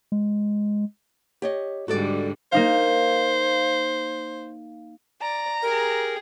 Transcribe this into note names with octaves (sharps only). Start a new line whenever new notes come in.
G#3
G4 C#5 D#5
G#2 D3 G3 F#4 A4 D5
A#3 D#4 C5 F5
D5 A#5
G4 G#4 A#4